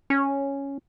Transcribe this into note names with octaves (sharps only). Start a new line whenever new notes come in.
C#4